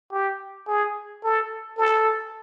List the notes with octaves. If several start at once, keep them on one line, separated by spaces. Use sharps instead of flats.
G4
G#4
A4
A4